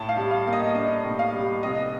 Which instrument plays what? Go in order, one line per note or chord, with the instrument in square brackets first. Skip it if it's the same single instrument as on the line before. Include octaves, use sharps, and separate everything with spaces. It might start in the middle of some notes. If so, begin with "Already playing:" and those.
Already playing: [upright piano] A2 A5
F5
G3
F5
A#3 F5
D#5
D4 D#5
A2
F5
G3
F1 D#5